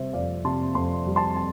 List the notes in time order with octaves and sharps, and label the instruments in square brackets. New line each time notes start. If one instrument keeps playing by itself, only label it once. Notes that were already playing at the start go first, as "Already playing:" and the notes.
Already playing: [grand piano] C3 G3 C5 E5
F2 D5 F5
C3 A5 C6
F2 A5 C6
G3
A5 C6
A5